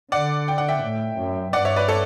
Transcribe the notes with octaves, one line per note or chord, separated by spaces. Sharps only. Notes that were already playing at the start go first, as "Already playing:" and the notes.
D3 D5 F#5
G5
F#5
E5 G5
A2
F#2
G2 D5 F#5
C#5 E5
B4 D5
A4 C#5